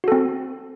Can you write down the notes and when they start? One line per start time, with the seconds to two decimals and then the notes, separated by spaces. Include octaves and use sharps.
0.04 F#4
0.08 A4
0.12 C4